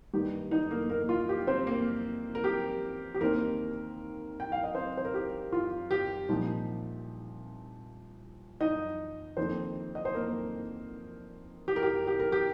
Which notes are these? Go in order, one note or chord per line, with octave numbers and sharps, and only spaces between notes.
G2 D#3 G3 A#3 D#4 G4
D#4 D#5
A#3 A#4
A#3 A#4
F4
G4
C4 C5
A#3 A#4
A#4
G4
G4
D#2 D#3 A#3 C4 D#4 A#4
G5
F5
D#5
C4 C5
C5
A#4
G4
F4
G4
C2 A#2 F3 D#4
D#4 D#5
F2 D#3 A#3 C4 D#4 C5
D#5
C5
A#3 A#4
G4
A#4
G4
G4
A#4
G4